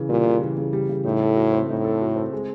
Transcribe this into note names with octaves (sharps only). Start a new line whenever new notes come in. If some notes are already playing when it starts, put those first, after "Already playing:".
Already playing: C#3 E3
A#2 G3
C#3
E3
C#3
G3
C#3
A2 D#4
A4
F#4
C4
A2 D#4
A4
F#4
C4
G#3